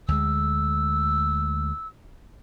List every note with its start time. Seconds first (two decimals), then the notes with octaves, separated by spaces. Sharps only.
0.08 D2 G#3 E6